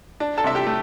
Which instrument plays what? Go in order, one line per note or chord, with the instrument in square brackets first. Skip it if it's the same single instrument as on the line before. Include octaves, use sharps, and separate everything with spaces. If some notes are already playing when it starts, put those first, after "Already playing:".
[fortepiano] D4
A4 A5
C3 E5
G4 G5
A3